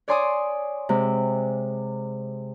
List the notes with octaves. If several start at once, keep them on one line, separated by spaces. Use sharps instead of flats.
C#5 D5 G#5 C6 D6 D#6
C3 G#3